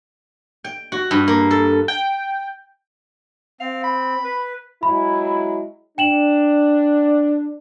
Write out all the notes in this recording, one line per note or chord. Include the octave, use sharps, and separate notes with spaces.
G5
F#4
G2
A#3
A4
G5
C4 F5
B5
B4
F#3 G#3 E4 B5
D4 G5 E7 F#7